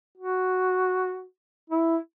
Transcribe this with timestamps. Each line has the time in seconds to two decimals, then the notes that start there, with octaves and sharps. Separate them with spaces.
0.17 F#4
1.70 E4